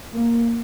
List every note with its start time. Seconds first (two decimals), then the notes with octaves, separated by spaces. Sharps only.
0.14 A#3